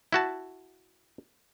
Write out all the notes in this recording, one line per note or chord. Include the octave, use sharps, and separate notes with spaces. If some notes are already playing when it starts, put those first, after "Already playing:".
E4 F#4 A5